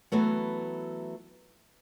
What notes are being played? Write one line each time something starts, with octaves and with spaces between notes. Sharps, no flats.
E3 F#3 A3 B3